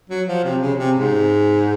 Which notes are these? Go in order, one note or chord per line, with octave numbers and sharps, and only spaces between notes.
F#3
F3
C3
C#3
C3
G#2